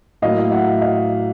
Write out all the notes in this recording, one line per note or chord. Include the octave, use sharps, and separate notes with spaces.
A2 F#3 A#3 D#5 F5
E5 F#5
D#5 F5